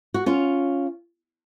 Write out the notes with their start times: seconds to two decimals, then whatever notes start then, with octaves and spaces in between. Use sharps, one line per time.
0.14 F#4
0.26 C#4 F4